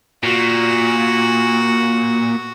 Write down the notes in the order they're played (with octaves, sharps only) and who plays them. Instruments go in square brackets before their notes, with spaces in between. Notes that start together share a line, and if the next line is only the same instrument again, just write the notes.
[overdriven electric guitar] A#2 [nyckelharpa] F#4